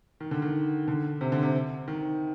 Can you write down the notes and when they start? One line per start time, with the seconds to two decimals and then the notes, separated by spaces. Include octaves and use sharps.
0.20 D#3
0.31 D3
0.42 D#3
0.88 D3
1.21 C3
1.32 D3
1.43 C3
1.88 D#3